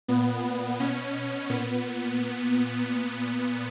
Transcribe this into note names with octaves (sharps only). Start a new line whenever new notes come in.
A#2 B3
B2 C#4
A#2 B3